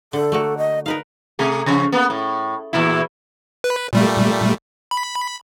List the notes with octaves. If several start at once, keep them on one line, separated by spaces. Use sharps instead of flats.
D3 A4
A3 A#3 F#4
D#5
D#4 A#4 B4 F5
C3 A3 G#4
C#3 F3 C#4
A#3 B3
A2
E2 A#2 E4
B4
A#2 G3 A3
B5